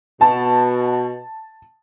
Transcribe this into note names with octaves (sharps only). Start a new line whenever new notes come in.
B2 A5